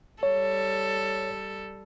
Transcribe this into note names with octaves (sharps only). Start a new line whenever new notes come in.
G3 A4 C#5